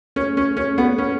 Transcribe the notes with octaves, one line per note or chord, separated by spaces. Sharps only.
C#4
C#4
C#4
B3
C#4